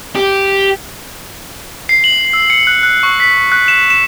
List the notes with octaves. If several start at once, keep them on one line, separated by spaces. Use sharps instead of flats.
G4
C7
F#7
E6
C#7
F#6
F#6
C#6
B6
F#6
E7
E7